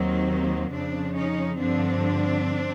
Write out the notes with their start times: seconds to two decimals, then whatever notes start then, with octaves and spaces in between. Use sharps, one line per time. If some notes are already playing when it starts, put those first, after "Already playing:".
Already playing: D#2 D#3 F#3 A#3 C4
0.71 F2 C#3 F3 C4 D4
1.14 C#4 D#4
1.58 G2 D3 F3 C4 D4